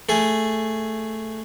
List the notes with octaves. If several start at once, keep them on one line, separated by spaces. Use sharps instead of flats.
A3 G#4